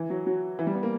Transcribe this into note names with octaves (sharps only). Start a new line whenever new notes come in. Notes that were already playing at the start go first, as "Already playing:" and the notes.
Already playing: E3
F#3
F#3
E3
G3
B3
A#3